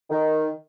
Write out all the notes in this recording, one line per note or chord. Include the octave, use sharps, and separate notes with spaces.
D#3